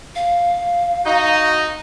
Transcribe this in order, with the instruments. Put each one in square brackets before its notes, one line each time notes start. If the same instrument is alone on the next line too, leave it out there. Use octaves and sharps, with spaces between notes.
[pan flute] F5
[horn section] D#4 [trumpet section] F#4 A#5